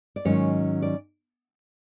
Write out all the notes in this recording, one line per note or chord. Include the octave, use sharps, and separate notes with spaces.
D5
G#2 D#3 F#3 C#4 C#5
D5